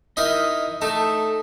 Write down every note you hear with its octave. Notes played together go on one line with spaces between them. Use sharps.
D#4 E4 A#4 D#5
A3 D#4 A5